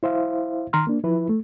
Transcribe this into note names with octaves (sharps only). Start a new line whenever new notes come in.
E4 C5 E5 F5
D#3 A#5 C6 F6
A#3 D4
F3 E4 B4
A3